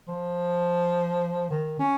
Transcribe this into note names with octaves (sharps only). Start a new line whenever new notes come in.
F3
D#3
C#4